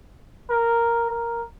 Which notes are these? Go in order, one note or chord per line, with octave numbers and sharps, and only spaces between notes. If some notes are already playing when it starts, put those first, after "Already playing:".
A#4
A#4